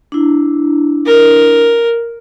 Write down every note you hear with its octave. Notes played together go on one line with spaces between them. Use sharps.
D4 E4
A#4